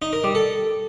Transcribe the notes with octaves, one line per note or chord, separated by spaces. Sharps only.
D#4
A#4
G3
A4